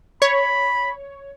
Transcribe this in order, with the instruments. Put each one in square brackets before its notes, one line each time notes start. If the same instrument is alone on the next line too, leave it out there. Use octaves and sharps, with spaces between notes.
[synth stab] C#5 [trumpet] B5